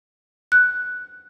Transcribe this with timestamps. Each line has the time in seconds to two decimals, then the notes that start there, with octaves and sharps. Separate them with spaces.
0.52 F#6